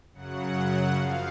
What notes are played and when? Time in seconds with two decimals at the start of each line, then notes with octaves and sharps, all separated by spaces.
0.13 F#2 C#3 F#3 F#5
0.93 F#2 F3 F5